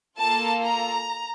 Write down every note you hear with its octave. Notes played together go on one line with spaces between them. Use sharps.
A#3 F4 A4 A5
A#5